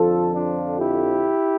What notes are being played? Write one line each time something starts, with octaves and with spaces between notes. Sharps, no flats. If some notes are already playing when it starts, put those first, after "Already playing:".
Already playing: F2 D3 F3 F4 A4
D4 F4
E4 G4